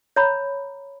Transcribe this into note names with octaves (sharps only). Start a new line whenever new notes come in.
C#5 A#5 B5